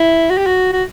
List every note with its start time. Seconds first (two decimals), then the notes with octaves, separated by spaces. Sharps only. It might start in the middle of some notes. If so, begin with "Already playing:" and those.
Already playing: E4
0.30 F#4
0.38 G4
0.47 F#4
0.73 F#4